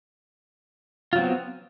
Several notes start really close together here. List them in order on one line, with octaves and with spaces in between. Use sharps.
F4 F#3 C4 B3